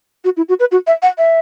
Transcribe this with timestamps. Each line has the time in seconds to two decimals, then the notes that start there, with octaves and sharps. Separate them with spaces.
0.25 F#4
0.37 E4
0.49 F#4
0.60 B4
0.72 F#4
0.87 E5
1.02 F#5
1.18 E5